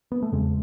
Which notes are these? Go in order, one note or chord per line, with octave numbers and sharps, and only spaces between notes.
B3
A3
E2 C#3 G#3